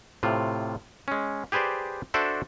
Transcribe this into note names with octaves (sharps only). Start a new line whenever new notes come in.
A2 C3 F4
G#3 C#4
G4 G#4 B4 C5 D5
D4 F#4 A4 C5 D5 E5